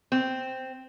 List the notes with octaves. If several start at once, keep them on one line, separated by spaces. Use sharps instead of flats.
C4